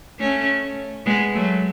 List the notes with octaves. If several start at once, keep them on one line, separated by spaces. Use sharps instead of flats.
A3 C#4
G#3 B3
F#3 A3